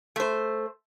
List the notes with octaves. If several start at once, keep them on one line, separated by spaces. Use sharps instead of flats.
A3 C5